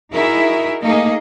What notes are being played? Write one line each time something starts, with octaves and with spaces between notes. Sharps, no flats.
D#4 E4 F#4 G#4 A#4 E5
A3 A#3 D#4 G#4 D#5